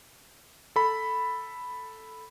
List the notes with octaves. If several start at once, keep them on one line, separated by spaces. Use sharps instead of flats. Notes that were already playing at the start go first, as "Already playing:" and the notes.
A4 B5